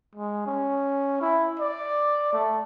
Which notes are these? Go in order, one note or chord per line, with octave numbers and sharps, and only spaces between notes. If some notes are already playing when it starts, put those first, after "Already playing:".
G#3
C#4
E4
D5
A3